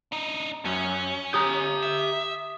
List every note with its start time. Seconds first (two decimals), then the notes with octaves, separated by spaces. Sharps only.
0.12 D4 D#4
0.65 F#2 C#4
1.34 G4 A#5 D#6
1.83 E5